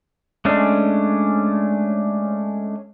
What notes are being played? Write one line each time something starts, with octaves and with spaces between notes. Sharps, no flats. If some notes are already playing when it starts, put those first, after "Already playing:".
G#3 A3 C#4 D4